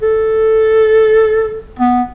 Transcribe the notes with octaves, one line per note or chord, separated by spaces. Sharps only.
A4
B3